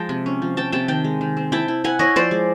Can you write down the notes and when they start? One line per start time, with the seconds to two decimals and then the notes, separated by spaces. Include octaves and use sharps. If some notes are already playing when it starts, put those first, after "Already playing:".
Already playing: F3 G#3 G5 A5
0.09 C3
0.26 C#4
0.42 F3
0.57 F3 G5 A5
0.72 C3 G5 A5
0.88 D#3 G5 A5
1.04 G#3
1.21 D#3
1.37 C4
1.52 E4 G5 A5
1.68 E4
1.84 E4 F#5 G#5
1.99 E4 C#5 D#5
2.16 F3 C5 D5
2.31 G#3